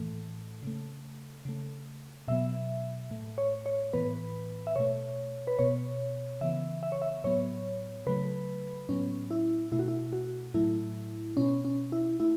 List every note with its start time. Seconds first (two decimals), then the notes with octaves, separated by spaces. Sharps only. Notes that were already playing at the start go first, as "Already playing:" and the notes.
Already playing: A2 E3 A3
0.63 C#3 A3
1.45 C#3 A3
2.28 B2 F#3 B3 E5
3.11 A2 A3
3.38 C#5
3.66 C#5
3.93 A2 E3 B3 B4
4.67 E5
4.76 B2 A3 C#5
5.47 B4
5.59 B2 B3 C#5
6.41 C#3 E3 B3 E5
6.83 E5
6.92 C#5
7.02 E5
7.24 A2 F#3 B3 C#5
8.07 C#3 F#3 A3 B4
8.89 A2 F#3 B3 C#4
9.31 E4
9.72 B2 A3 E4
9.79 F#4
9.88 E4
10.13 F#4
10.54 A2 F#3 A3 E4
11.37 B2 B3 C#4
11.65 C#4
11.92 E4
12.20 A3 E4